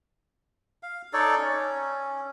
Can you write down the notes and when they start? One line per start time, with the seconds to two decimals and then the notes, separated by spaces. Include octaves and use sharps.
0.83 F5
1.13 D#4 A4 C#5 D5
1.39 C#4